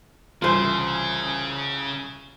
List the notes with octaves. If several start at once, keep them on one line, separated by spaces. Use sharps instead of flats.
C2 C#3 E3 F4 G#4 C5